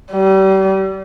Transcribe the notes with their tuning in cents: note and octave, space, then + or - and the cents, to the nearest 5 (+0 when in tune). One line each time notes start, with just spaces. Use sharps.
G3 -35